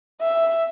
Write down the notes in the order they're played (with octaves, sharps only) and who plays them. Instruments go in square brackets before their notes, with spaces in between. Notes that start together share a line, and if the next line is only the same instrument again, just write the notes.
[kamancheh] E5